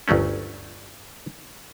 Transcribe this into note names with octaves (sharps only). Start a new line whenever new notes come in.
G1 D2 F#3 A3 C#4